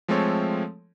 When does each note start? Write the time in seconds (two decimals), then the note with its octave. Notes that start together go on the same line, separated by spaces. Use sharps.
0.08 F3 G#3 A3 C4 A4 C#5